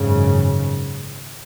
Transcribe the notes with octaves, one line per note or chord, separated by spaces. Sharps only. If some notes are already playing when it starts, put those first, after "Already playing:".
Already playing: G#1 F#2 C#3